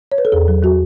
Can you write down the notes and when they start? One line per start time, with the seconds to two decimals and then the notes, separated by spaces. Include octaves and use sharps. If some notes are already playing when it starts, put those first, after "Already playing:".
0.12 C#5
0.18 B4
0.25 A4
0.32 E2 G#4
0.48 F#3
0.63 F#3 F#4